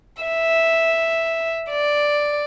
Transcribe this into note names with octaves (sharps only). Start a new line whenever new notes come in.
E5
D5